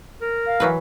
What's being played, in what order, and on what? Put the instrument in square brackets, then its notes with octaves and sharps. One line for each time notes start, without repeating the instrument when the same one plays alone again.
[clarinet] A#4
[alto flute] F5
[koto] E3 F#3 B4